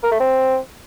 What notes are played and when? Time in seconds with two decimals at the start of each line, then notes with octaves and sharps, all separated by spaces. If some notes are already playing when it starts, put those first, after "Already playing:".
0.03 A#4
0.12 A3
0.20 C4